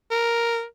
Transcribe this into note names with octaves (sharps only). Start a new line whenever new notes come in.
A#4